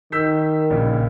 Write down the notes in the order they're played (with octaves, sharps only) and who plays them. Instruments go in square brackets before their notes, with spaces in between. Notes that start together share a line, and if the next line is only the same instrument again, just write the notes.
[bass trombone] D#3 [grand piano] E6 G6 B6
[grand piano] A#1 A#2 C#3